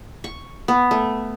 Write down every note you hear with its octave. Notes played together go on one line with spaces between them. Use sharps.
C#6
B3
A3